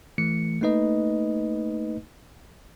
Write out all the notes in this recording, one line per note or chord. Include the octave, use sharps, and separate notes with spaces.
E3 A3 C#7
A3 A#3 D#4 B4 D#5